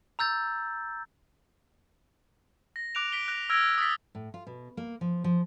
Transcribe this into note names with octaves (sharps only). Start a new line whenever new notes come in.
A#5 E6 G6 A6
A#6
D6 F#6 D7 F7
B6 D7 G7
F#6 A#6
E6 F6 G#6 A#6 D7
D#6 A6 B6
A2
F4
B2
A#3
F3
F3